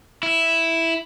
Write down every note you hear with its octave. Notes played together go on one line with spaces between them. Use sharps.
E4